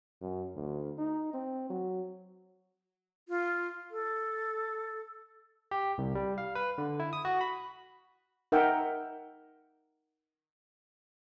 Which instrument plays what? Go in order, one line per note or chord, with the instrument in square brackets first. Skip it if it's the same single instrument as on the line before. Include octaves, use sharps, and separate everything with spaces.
[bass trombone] F#2
D2
D#4
C4
F#3
[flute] F4
A4
[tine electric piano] G4
C2
G3
F5
B4
D3
E4
D#6
F#4
B5
[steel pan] D#4 A#4 E5 F#5 G5